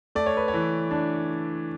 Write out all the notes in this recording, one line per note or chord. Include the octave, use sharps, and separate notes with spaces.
A3 D5
C#5
B4
C#5
E3
D4